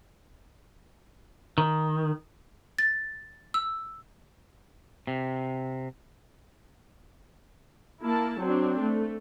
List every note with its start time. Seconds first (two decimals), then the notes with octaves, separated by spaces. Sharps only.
1.58 D#3
2.79 A6
3.54 E6
5.07 C3
8.03 A#3 E4 A5
8.41 F#3 C4 D4
8.80 A3